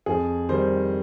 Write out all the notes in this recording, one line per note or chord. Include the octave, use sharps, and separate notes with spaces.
F2 G#4
D#3 G3 C5